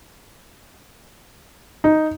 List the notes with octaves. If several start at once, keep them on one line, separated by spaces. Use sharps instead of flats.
D#4